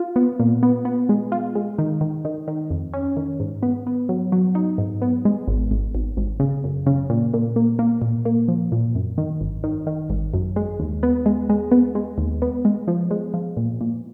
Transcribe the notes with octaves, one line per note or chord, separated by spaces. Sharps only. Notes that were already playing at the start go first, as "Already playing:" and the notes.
Already playing: F4
B3
A#2
B3
B3
G#3
F4
G#3
D#3
D#3
D#3
D#3
F2
C#4
D#3
G#2
B3
B3
F#3
F#3
D#4
G#2
B3
G#3
G#1
G#1
G#1
G#1
C#3
F#2
C#3
A#2
A#2
A#3
A#3
A#2
A#3
F3
A#2
F#2
D#3
G#1
D#3
D#3
G#1
F#2
G#3
D#2
B3
G#3
G#3
B3
G#3
D#2
B3
G#3
F3
G#3
F3
A#2
A#2